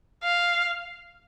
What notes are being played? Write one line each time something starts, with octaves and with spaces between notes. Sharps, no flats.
F5